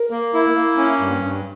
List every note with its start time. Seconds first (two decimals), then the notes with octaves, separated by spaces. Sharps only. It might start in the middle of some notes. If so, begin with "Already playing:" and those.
Already playing: A#4
0.11 A#3
0.34 E4
0.55 A#3
0.77 C#4
1.00 G2
1.23 G2